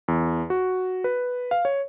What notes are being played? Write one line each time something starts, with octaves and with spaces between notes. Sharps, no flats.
E2
F#4
B4
F5
C#5